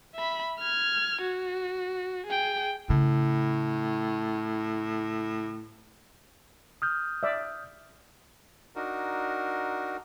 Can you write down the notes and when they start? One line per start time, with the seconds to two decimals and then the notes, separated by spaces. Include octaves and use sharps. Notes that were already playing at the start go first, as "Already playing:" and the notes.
0.15 E5 B5
0.60 F6 G#6
1.22 F#4
2.27 G#4 G5
2.90 A2 C#3
6.82 D#6 F6 G6
7.23 D5 E5
8.76 D4 D#4 F#4 A#4